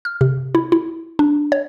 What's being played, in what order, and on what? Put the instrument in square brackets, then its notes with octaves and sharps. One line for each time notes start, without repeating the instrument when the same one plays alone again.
[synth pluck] F6
C3
E4
E4
D4
C#5